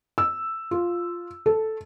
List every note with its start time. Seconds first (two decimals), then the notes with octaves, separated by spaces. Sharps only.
0.18 E6
0.71 F4
1.46 A4